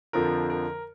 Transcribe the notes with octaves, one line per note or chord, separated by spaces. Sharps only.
F2 D3 F3 A#4
A#4